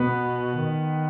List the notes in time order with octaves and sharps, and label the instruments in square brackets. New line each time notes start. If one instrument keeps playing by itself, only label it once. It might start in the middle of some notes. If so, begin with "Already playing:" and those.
Already playing: [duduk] B2 [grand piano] B3 B4
[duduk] D#3